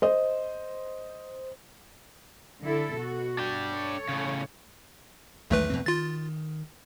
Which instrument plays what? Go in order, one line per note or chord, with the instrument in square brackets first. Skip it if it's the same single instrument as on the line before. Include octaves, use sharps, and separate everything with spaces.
[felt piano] C5 D#5
[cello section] D3 E4 A4
B2 F#4
[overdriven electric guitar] D4 G5
[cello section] A4 C#5
[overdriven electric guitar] A2 C#3
[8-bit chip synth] B1 A3 B4 [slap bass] E2 D#3 G#3
[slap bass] E2 B2 C4
[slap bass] D#3 [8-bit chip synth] F4 A6